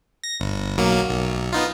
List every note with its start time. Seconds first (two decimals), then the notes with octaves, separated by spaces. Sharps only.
0.24 A#6
0.40 G1
0.77 B1 F#3 A#3
1.09 B1
1.53 B3 D#4 F4